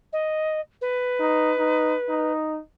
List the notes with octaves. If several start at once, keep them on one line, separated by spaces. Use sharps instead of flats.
D#5
B4
D#4
D#4
D#4